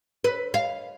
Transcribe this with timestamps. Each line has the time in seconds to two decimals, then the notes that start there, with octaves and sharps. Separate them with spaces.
0.24 B4
0.54 F5